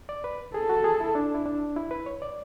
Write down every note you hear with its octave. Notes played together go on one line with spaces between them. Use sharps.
D5
B4
G#4 A4
F#4
G#4
E4
D4
E4
D4
E4
B4
C#5
D5